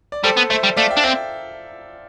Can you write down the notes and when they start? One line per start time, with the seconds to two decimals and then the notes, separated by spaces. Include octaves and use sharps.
0.12 D5
0.24 G3 A4 C5
0.37 B3
0.50 A3 C5 E5
0.63 G3
0.77 A3 D5 F5
0.90 E5 G5
0.97 D4
1.04 C4 E5 G5